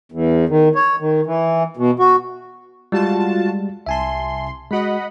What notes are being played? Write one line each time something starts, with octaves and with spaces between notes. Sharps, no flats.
E2
D#3
C#5
D#3
E3
B2
F#4
G3 G#3 F4 F#4 A5
C2 E5 G#5 A5 C6
G#3 F#4 D#5 F#5 B5